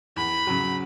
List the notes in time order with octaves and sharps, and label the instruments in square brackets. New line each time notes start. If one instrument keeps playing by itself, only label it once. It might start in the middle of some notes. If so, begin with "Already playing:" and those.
[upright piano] E2 [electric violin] B5
[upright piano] C#3 F#3